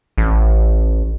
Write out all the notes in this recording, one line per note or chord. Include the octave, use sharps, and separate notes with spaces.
A1